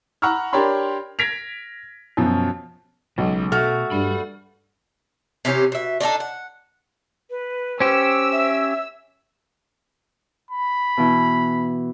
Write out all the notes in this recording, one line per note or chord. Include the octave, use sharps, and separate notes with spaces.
F#5 A#5 B5 C#6 E6 F6
D4 G4 A#4 C#5 B5 C6
G#6 A#6 B6 D7 F7
F#2 B2 F3
B1 C#3 G#3
B2 A3 F#4 F6
G2 D5 B5
C3 E3 C#4 G4
B2 E5
D4 D#4 F#4 A4
F#5
B4
C#4 G4 C5 E6
E5
B5
B2 E3